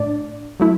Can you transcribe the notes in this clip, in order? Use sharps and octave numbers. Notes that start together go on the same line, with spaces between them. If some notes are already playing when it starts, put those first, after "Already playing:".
Already playing: A2 D4 D5
F#3 A3 E4